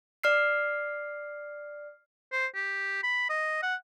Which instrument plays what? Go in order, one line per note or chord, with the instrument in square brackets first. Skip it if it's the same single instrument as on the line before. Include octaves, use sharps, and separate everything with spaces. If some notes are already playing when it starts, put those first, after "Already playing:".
[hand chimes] D5 F6 C7
[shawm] C5
G4
B5
D#5
F#5